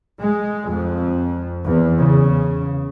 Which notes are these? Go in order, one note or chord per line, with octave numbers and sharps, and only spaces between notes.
G#3
F2
E2
C#3